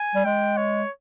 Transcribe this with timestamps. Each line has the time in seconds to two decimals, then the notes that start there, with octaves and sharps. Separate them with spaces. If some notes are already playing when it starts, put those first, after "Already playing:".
Already playing: G#5
0.15 G3
0.25 G#3 G5
0.57 C#5